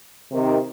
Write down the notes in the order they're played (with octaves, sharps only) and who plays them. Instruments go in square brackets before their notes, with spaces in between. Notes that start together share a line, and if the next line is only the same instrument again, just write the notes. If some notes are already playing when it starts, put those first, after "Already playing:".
[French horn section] C3 D#3